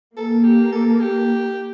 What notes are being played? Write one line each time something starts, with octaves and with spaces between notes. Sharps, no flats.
A#3 A4
G4
A4
G4